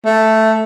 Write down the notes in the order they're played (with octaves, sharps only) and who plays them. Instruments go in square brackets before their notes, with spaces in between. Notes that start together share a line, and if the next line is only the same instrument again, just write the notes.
[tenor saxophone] A3